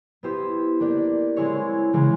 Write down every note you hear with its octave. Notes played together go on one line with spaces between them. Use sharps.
B3 E4 G4 C5
A#3 D4 G4
G#3 C4 E4 G#4 C#5
C#3 E3 G#3 C#4